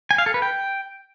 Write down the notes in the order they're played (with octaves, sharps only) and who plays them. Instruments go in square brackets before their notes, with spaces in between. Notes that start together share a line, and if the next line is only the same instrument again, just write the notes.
[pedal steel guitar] G#5
F5
A4
B4
G5